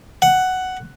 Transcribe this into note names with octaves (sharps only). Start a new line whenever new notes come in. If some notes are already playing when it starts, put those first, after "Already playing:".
F#5